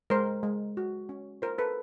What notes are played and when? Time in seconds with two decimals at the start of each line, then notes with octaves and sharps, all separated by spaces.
0.10 G#3 A#4 C5
0.43 G#3
0.77 F#4
1.09 C#4
1.42 F4 A#4 C5
1.58 A4 B4